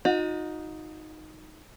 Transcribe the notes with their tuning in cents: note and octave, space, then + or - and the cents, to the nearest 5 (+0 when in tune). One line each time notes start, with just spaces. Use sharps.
D#4 +0 F#4 -45